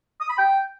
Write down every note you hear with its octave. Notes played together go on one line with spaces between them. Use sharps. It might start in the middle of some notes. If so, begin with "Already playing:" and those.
D#6
B5
G5